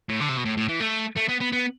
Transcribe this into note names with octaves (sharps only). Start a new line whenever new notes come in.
A2
D3
C3
B2
A2
A2
E3
A3
A3
B3
B3
B3